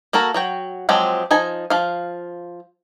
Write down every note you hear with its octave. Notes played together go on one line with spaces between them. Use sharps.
A#3 F#4 A4 A#4
F#3 F#4 G5
F3 F#3 G#3 C4 G4
F3 D#4 G#5
F3 F5